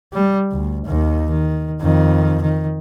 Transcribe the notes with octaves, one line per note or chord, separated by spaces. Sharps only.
G3
D2
D#2 D#3
D#3
F2 D#3
D#3